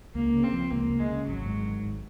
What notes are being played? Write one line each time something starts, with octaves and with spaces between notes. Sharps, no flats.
C#2 A#3
C#3
C4
F3
C#2 A#3
C#2
G#3
C#3
G#1 F#3
G#2
D#3
G#1